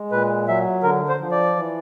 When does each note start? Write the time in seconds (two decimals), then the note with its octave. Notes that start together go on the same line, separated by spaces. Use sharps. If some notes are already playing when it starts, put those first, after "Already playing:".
Already playing: G#3
0.11 A#2 B4
0.48 F#3 E5
0.83 D3 A#4
1.09 C5
1.20 F3
1.32 D5
1.56 E3